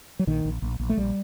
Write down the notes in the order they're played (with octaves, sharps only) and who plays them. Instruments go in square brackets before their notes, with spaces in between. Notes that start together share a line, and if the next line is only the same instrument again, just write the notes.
[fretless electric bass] F#3
A#1 D#3
A#1
A#1
A#1
A3
A#1 G3